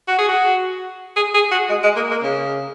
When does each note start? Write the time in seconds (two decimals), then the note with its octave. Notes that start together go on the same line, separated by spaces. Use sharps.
0.08 F#4
0.19 G#4
0.29 F#4
1.16 G#4
1.34 G#4
1.51 F#4
1.69 G#3
1.84 G#3
1.96 A#3
2.11 A#3
2.23 C#3